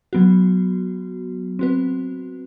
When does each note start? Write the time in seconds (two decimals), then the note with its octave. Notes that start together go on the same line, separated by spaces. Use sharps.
0.13 F#3 B3 F#4
1.59 C4 F#4 B4